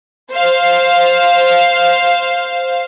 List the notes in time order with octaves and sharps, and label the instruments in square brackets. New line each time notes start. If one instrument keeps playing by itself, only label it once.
[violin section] C5 F5